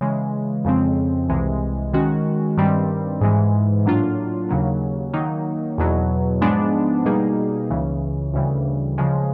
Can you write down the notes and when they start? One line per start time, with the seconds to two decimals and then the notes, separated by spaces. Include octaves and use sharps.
0.01 C#3 E3 G#3
0.65 F2 C#3 F3 G#3 C4
1.29 C2 C3 E3 G#3
1.94 D#3 G#3 C#4 F#4
2.57 G2 D#3 G3 C4
3.21 G#2 E3 G#3
3.85 A2 F#3 A#3 D4 F4
4.49 D#2 C#3 F#3 A#3
5.13 D#3 F#3 A#3 D#4
5.78 E2 B2 F#3
6.41 G#2 F3 G#3 B3 D4
7.05 B2 G3 A#3 D#4 G#4
7.70 C#2 C#3 E3
8.34 D2 C#3 E3 G3
8.98 C#3 F3 G#3